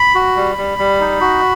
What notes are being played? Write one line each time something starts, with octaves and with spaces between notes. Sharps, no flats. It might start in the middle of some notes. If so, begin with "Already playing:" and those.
Already playing: B5
F#4
G3
G3
G3
D#4
F#4